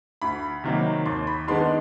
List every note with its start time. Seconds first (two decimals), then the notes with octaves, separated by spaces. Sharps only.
0.22 D2 B5
0.64 C3 D#3 F#3 A#3
1.06 D#2 C6
1.27 B5
1.47 D#3 G#3 B3 D4 C6